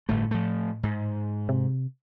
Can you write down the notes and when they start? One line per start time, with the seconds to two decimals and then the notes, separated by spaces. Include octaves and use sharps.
0.09 G1 A2 A3
0.31 F3 A3
0.83 G#2
1.49 C3